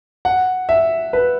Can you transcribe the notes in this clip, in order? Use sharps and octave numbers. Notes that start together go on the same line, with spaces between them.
F#5
E5
B4